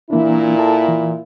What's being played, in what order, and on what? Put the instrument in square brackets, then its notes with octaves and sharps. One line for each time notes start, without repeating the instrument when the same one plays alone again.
[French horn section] A#2 E4 [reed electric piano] E3 A#3 D4
[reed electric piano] A4 A5
E3